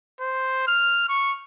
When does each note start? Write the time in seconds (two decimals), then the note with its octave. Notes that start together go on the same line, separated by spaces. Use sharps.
0.20 C5
0.67 F6
1.09 C#6